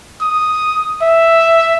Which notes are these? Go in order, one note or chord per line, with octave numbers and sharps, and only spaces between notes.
D#6
E5